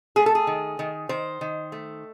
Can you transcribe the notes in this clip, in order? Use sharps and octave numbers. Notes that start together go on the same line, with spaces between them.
A3 G#4
A4
G#4
D#3
D#3
D#3 C5
D#3
A3